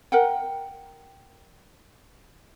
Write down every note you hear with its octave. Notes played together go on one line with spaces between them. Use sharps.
A#4 F#5 G5